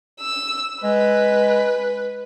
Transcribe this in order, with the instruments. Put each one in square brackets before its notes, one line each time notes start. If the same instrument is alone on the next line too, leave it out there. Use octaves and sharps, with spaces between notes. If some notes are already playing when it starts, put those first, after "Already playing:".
[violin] E6
[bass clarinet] G#3 [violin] B4